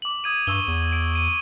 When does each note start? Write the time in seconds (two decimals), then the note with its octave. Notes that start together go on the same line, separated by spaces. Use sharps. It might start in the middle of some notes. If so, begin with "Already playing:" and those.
0.02 D6 F#7
0.24 D#6 G#6 D#7
0.47 G2 C#6 E6 G7
0.68 E2
0.92 D7
1.15 D#7